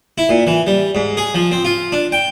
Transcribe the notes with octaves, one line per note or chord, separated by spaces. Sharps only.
E4
A#2
E3
G3
G#2
G#4
F3
C4
F4
D4
G5